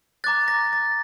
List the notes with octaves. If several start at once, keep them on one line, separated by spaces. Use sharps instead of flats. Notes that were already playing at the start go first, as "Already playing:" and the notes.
A#5 D6 F#6 A6
A#6
A6